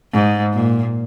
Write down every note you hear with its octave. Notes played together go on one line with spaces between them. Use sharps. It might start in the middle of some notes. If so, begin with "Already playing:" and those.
G#2
A#2